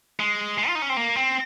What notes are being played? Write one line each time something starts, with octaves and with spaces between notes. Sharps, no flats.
G#3
G#3
F4
D#4
C#4
C4
A#3
C4